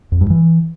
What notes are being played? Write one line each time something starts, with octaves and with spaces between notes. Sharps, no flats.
F2
G2
E3